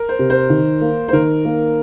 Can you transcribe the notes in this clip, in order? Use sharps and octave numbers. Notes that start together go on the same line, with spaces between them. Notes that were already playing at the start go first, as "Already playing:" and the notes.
Already playing: A#4
C5
C3
C5
D#3
A#3
C5
D#3 A#4
A#3